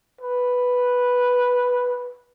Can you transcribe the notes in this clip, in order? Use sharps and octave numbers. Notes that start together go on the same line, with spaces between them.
B4